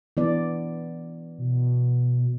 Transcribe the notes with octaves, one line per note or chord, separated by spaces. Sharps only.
E3 B3 D5
B2